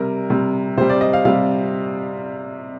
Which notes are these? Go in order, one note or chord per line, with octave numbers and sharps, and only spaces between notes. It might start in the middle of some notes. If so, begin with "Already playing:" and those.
Already playing: C3 G3 A#4
C3 G3
C3 G3 C5
D5
D#5
F5
C3 G3 F5